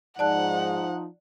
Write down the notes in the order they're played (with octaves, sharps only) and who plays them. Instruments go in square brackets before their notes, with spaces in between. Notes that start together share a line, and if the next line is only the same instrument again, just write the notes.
[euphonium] G#2 [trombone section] F3 D#4 [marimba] D5 A5 F#6 [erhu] F#5